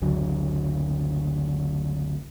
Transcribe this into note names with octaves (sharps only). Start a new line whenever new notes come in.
F#1 D2 D3 F#3